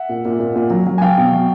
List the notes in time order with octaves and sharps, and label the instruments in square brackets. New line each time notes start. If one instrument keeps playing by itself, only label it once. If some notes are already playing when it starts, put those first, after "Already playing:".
Already playing: [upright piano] E5 F#5
A#2
A#2
A#2
A#2
F#3
F#3
G#5
F#3 F5 G5
B2
F#3